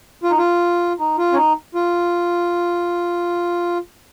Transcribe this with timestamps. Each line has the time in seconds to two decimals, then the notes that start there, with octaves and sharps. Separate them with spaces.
0.24 F4
0.31 D#4
0.38 F4
1.00 D#4
1.18 F4
1.32 C#4
1.36 D#4
1.75 F4